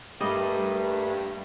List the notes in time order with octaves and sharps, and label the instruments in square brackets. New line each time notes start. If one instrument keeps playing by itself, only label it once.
[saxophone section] G2 [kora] G3 D#5 [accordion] A3 A#3